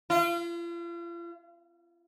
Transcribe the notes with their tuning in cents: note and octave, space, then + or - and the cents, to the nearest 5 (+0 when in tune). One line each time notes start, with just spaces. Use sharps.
F4 -40